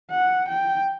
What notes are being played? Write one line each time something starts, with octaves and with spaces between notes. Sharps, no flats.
F#5
G5